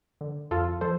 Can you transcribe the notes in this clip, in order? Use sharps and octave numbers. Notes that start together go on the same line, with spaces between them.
D3
F2 F4 A4
F3 A4 C5